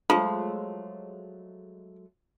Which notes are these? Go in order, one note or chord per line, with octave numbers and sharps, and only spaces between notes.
F3 F#3 G#3 A3 F4